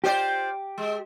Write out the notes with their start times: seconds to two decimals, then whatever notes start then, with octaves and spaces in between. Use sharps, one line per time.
0.04 F4 G4 C5 D5
0.78 G#3